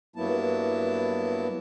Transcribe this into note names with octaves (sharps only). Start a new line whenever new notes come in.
G2 F#3 A#3 B3 E4 A5